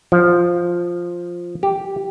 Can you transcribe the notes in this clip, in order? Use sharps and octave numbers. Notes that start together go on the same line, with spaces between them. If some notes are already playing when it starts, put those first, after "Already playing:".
F3
G4